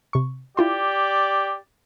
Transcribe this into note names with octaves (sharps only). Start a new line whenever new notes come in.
C3 C#6
E4 F4 G4 D5 C6